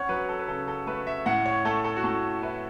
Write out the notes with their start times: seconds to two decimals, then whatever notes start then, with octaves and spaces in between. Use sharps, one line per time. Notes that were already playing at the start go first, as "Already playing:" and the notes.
Already playing: C#4 C#5 F#5
0.09 F#3 B4
0.29 A4
0.39 B4
0.48 C#3 A4
0.68 A4
0.87 A3 B4
1.07 E5
1.26 A2 F#5
1.46 C#5
1.65 A3 A4
1.85 A4
1.97 F#4
2.04 A2 A4
2.43 E4 B4